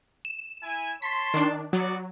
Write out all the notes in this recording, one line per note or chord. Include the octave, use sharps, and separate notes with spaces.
E7
E4 G#5
C#5 A5 C6 B6
D#3 D4
F#3 B3 F#4 D5